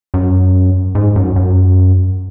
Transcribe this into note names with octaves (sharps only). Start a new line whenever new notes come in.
F#2
G#2
F#2
F#2